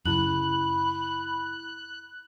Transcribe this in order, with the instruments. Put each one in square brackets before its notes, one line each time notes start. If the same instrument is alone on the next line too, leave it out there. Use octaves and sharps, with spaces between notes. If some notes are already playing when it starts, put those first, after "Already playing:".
[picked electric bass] F#2 C#3 [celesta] E4 F#7 [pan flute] B5 [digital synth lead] F#6